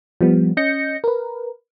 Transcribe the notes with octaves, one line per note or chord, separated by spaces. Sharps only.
F3 G3 B3
C#4 D#5 G6 A#6 C#7
A#4 B4